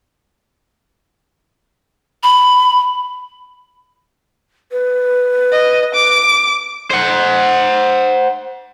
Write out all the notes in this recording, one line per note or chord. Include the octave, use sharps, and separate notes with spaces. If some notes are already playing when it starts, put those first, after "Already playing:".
B5
B4
D#5
D6
C5 F#5